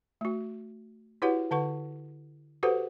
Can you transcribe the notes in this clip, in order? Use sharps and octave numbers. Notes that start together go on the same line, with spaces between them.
A3 F#4
E4 F#4 G4 B4 C#5 F#5
D3 B4 F#5 C#6
F#4 G4 A4 B4 C5 F#5